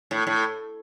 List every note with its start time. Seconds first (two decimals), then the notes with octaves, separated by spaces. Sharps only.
0.11 A2
0.27 A2